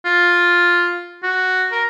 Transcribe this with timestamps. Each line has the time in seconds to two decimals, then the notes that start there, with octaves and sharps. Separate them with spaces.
0.05 F4
1.23 F#4
1.72 A#4